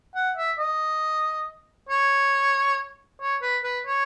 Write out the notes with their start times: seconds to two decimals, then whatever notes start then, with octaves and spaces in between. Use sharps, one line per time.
0.15 F#5
0.37 E5
0.58 D#5
1.89 C#5
3.21 C#5
3.42 B4
3.64 B4
3.87 C#5